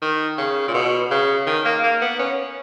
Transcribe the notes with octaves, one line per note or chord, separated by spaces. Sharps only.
D#3
C#3
A#2
B2
C#3
D#3
A#3
A#3
B3
C#4